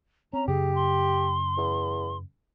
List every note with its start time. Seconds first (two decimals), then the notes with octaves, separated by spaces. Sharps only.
0.33 C4 C#4 A#5
0.48 F#2 C#3 G4 G#4
0.75 C6
1.58 E2